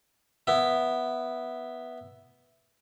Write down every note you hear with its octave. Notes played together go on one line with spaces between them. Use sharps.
B3 E4